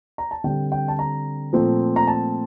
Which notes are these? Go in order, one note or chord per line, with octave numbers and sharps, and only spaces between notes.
A#5
A5
D3 G3 C4 G5
G5
A5
A#5
A#2 F3 A3 C4
A#5
A5